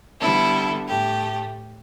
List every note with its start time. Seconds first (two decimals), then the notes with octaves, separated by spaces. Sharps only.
0.20 D3 G3 B3 E4 A4
0.87 A2 A3 G4